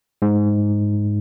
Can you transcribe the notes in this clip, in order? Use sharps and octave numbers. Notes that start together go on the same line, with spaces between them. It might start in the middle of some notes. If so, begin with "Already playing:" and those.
G#2